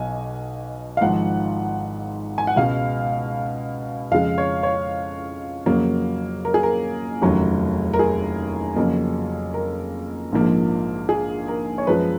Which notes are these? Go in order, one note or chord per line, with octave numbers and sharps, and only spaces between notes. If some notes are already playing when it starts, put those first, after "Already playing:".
Already playing: B1 B2 G#5
F5
G#1 G#2 F3 F#5
G#5
F#5
C#2 B2 G#3 F5
F2 C#3 G#3 F5
C#5
C#5
F2 C#3 F#3 A#3
A#4
G#4
A#4
F1 D#2 C#3 F#3
A#4
G#4
F2 C#3 F#3 A#3
A#4
A#1 G#2 F3 A#3
G#4
A#4
C#5
F#2 F3 G#3 B4